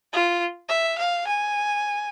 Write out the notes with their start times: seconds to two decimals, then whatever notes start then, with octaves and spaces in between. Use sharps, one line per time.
0.13 F4
0.69 E5
0.98 F5
1.27 G#5